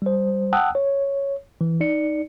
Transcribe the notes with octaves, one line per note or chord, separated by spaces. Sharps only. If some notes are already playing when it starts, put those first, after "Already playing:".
G3 C5
F#5 G5 A5 D#6 E6 F#6
C#5
E3
D#4 D5 C#7